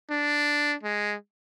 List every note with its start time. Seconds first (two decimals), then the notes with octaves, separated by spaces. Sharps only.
0.10 D4
0.83 G#3